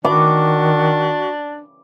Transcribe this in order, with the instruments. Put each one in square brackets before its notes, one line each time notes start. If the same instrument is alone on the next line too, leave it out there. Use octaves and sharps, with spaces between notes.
[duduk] D#3 [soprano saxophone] D4 [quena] F#4 [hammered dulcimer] D6